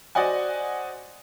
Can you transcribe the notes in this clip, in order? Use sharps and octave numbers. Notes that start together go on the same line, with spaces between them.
F#4 C5 D5 D#5 F#5 G#5